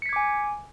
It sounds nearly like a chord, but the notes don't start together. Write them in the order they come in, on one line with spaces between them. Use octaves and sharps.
C#7 B6 G#6 D6 G#5